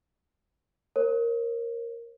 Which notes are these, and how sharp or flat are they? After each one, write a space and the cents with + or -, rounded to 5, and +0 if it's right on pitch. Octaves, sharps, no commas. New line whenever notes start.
A#4 +0 C#5 -45